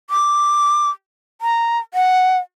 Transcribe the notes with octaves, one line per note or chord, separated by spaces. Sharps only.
D6
A#5
F#5